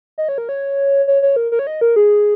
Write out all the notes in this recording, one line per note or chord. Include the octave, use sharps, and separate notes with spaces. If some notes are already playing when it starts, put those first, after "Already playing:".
D#5
C#5
A#4
C#5
C#5
C#5
A#4
A#4
C#5
D#5
A#4
G#4